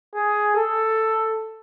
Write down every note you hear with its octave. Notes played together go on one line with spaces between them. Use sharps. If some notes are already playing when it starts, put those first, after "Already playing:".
G#4
A4